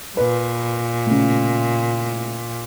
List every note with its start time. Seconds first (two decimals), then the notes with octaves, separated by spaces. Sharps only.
0.17 A#2 B4
1.06 A2 C#3